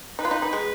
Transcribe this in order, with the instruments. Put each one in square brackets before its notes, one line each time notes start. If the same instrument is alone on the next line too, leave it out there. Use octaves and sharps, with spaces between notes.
[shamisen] D#4 [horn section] B4
[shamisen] F4
D#4
D#4
G#3